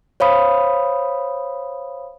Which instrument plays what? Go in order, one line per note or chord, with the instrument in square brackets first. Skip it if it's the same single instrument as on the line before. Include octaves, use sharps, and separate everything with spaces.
[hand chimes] C5 C#5 F5 B5 D#6